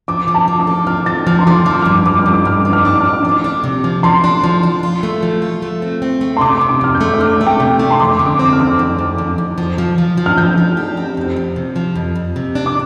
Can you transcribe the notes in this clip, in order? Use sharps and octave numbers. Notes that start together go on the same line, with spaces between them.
F3 D6
F3
A5
F3
D6
A4
F3 F6
F3 A6
F3 F6
C6
F3 D6
F3 F6
D6
F6
G2
G2 D6
F6
G2
D6
G2 F6
D6
F3
F6
D4 D6
D4 F6
D6
F3
D4
C3
F3
F3 C6
D4
F3
D4
F4
A3
F3
F4
A3
C4
C4
A3
C6
C3 D6
C3
D6
F2 F6
G6
A3
D6
F2 F6
A3
G5
C3
A3
C6
F2 D6
D3
D6
C4
F6
F2 D6
F6
F2
F2
F2
F2
F3
F3
F3
F3
F6
F3 G6
F3
G4
C4
F2
F3
C3
F3
F2
F2
C3
D4
D6